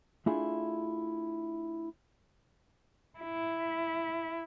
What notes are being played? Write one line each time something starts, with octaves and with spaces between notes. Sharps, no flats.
A3 D4 E4 F4 G#4
E4